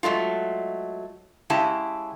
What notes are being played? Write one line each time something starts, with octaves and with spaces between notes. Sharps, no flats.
F#3 G#3 A3 F4
C#3 G#3 E4 G4 A5